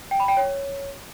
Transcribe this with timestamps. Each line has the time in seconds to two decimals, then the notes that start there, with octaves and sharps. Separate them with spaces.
0.11 G5
0.20 B5
0.28 G5
0.37 C#5